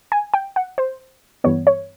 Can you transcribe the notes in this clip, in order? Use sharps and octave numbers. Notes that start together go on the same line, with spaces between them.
G#5
G5
F#5
C5
G2 E3 G3 B3 C#5
C#5